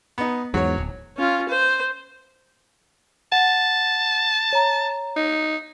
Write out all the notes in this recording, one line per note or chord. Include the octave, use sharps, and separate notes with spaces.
B3 D#4
E2 G#2 F#3 C#5
D1
C#4 F4
C5
F#5 A5
C#5 A#5
D#4